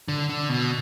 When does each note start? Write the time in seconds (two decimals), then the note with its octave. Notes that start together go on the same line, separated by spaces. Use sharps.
0.08 D3
0.29 D3
0.49 B2